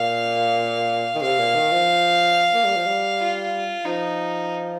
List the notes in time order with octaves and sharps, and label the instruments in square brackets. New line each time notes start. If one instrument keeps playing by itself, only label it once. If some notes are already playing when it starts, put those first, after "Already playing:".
Already playing: [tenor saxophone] A#2 [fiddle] F5
[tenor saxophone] D#3
[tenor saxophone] C3 [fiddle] F5
[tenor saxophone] A#2
D#3
F3
A#3
G3
F3
G3
[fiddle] F4
[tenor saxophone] F3 [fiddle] D#4